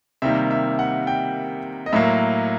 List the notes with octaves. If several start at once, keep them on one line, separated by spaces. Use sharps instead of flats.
C3 D#3 G3 A#3 E5
E5
F#5
G5
D#5
A2 F#3 A#3 E5